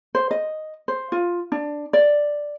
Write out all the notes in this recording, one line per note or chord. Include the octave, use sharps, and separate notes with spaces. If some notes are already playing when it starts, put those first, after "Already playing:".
C5
D#5
C5
F4
D4
D5